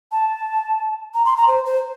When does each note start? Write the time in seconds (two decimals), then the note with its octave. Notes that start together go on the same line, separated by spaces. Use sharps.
0.12 A5
1.14 A#5
1.25 C6
1.37 A#5
1.48 C5
1.66 C5